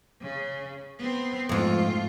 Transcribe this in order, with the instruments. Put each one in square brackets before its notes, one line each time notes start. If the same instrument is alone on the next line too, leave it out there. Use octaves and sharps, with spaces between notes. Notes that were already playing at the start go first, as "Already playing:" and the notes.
[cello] C#3
B3 C4
[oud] F2 G#2 [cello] A3 F4